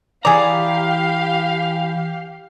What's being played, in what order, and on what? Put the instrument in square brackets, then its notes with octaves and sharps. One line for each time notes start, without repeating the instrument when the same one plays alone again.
[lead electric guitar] E3 A#5 [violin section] G4 F5 [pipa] G#4 D5